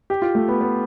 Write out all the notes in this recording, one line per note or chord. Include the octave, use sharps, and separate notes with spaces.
G4
F4
A3
B3
B3